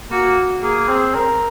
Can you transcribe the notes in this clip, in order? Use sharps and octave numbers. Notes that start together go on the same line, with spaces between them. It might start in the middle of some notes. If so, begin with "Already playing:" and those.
A#3 F#4
A#3 G#4
C4
A#4